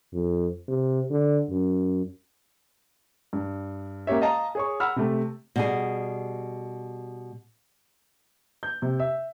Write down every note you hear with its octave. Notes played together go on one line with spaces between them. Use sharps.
F2
C3
D3
F#2
G2
A#3 C#4 G4 C#5 E5
D#5 F5 A5 A#5
G#4 C#5 C#6
F#5 B5 E6 F6
C3 A3
B2 G3 G#4
G6
C3
E5